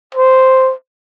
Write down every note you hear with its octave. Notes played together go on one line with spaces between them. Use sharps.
C5